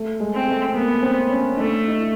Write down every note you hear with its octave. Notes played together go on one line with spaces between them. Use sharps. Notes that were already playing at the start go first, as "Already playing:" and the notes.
Already playing: A3
G#3
C4
A3
A#3 B3
C4
C#4
A3 D4
D#4
E4